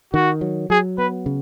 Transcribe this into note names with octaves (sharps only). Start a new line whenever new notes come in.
D#3 F#4
F#3
F#3 G#4
B3 B4
C#3